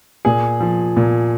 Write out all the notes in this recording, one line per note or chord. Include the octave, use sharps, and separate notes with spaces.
A#2 G#4
F3
A#2